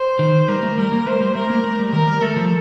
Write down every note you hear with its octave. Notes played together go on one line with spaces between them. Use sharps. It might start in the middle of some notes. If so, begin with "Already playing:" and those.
Already playing: C5
D#3
G3 A#4
A3
G3 A#4
A#3
A3 C5
G3
A3 A#4
A#3
A3
G3
D#3 A#4
G3
A3 A4
F3